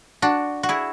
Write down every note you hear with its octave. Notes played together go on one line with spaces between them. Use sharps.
D4 F#4
F#4
E4 G#4